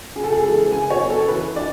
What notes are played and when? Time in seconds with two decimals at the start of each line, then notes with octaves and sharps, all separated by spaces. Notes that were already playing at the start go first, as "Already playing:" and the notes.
0.16 C#3 G#4
0.24 A4
0.33 G#4
0.43 E3 G#3 A4
0.71 C#3 G#5
0.90 C#5
0.99 F#3 B3
1.10 A4
1.28 E3 B4
1.56 D4 D5